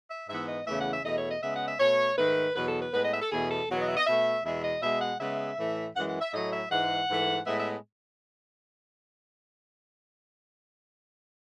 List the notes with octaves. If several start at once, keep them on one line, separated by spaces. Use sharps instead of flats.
E5
G#2 E3 B3 E5
D#5
E2 C#3 E3 A3 E5
F#5
E5
E2 B2 A3 D#5
C#5
D#5
C#3 G#3 B3 E5
F#5
E5
B2 A3 C#5
G#2 D#3 A3 B4
E2 B2 F#3 B4
A4
B4
A2 G#3 B3 B4
D#5
E5
A4
E2 B2 A3 G#4
A4
E2 B2 F#3 B3
D#5
E5
D#5
B2 A3 E5
E2 B2 G#3 E5
D#5
B2 G#3 B3 E5
F#5
C#3 G#3 B3 E5
A2 E3 A3
F#2 E3 G#3 F#5
F#5
E5
A2 F#3 A3 D#5
E5
G#2 E3 G#3 F#5
G#2 E3 A3
A2 G#3 B3 E5
E5